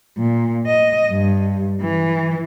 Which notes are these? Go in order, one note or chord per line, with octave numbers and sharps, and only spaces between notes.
A#2
D#5
G2
E3